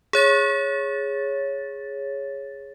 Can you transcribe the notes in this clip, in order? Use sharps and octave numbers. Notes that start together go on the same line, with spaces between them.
G#4 C#5 A6